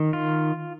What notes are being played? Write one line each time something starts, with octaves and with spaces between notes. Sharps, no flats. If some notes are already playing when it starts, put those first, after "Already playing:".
Already playing: D#3
F4